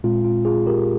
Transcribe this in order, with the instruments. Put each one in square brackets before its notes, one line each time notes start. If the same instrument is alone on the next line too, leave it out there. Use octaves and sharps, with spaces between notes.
[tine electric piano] A#2 G#3 C4 F4
F4
F4 G#4
G4 A#4